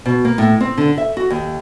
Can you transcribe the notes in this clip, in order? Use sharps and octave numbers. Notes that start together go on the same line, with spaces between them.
B2
A#3
A2
C4
D3
E5
F#4
D#2